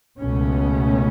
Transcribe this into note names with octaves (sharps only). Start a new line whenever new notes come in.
C#2 B2 A3 C#4